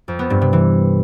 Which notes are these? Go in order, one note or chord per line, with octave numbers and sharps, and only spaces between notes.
F2
B3
G2
C3
E3